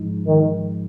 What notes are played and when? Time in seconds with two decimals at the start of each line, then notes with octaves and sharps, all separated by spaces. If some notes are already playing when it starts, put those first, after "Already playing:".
Already playing: G#2 F3 G#3 D#4
0.26 D#3